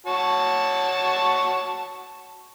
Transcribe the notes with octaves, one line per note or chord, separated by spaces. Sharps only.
F#4 C#5 A5